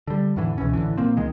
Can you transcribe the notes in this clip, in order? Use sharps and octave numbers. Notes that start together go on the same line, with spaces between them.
D3 G3
E2 A2 D3 E3
C#2 B2 E3 C#4
A1 D3 E3
A#2 A#3 C4
C#2 D#3 G#3